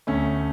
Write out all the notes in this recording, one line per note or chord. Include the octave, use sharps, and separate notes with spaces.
D2 A3 C#4